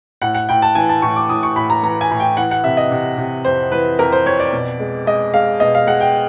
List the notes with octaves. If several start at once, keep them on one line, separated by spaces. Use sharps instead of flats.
A2 F#5
F#5
A2 G5
A5
E3 G#5
A5
A2 C#6
D6
A2 D#6
C#6
A2 B5
A#5
E3 A#5
G#5
A2
G5
E3 F#5
F#5
C3 E5
D#5
C3
C3
F2 C5
E3 B4
F2 A#4
C5
F2 C#5
D5
B2
G#3
G#3 D#5
G#3 F5
B2 D#5
F5
G#3 F#5
G5